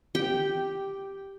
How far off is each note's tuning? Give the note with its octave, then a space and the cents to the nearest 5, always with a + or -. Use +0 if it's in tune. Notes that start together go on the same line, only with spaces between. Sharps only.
G4 +0 G5 -10